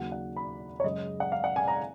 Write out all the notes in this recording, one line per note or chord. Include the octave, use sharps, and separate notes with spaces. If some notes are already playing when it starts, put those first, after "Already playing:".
Already playing: D#2 C#3 F#3 F#5
F#5
B5
C#5
F#2 C#3 G#3 D#5
F#5
F5
F#5
G#5
A#5